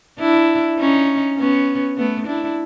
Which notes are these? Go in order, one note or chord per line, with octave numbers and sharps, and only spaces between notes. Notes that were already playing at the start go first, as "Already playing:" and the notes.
D4 E4
C#4 D#4
B3 C#4
A3 B3
D4 E4